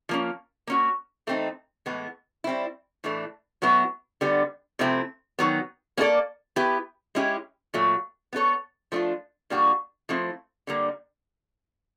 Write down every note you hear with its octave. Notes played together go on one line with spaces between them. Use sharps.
F3 A#3 C#4
A#3 C#4 F#4
E3 A3 C4 D#4
A2 E3 G#3 B3
G3 C4 E4
A2 E3 A3 D4
A2 F#3 B3 E4
D3 G3 B3
C3 F3 A3 C4 E4
D#3 F#3 B3
A#3 C#4 E4 A4 D5
B3 E4 G4 B4
G#3 C#4 E4 G4
A#2 F#3 A3
B3 E4 A4 C#5
F3 A3 D4 F4
A#2 G3 A#3 D4 F#4
F3 A3 C4 E4
D3 G3 A#3